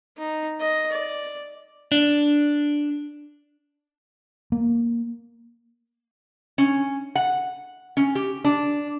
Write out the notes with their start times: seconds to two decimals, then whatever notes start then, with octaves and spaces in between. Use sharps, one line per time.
0.18 D#4
0.60 D#5
0.92 D5
1.92 D4
4.52 A#3
6.58 C#4
7.15 F#5
7.97 C#4
8.15 G4
8.44 D4